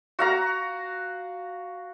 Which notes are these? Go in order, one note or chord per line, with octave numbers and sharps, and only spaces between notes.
F#4 F5 A#5